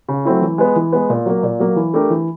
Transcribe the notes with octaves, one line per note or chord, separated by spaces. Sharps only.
C#3
F#3 A3 C4 E4
E3
G#3 B3
E3
G#3 B3
A#2
F#3 A#3
A#2
F#3 A#3
E3
A3 D4 G4 A#4
E3